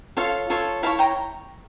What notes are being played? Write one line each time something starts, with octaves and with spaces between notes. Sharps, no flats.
F4 A4 C#5 F5
F4 A4 C#5
E4 A#4 C#5 F5 A5
G5 A#5